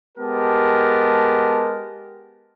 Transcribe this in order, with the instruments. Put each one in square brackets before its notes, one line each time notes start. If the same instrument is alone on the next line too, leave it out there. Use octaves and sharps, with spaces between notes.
[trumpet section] G#3 B3 G4 A#4 A5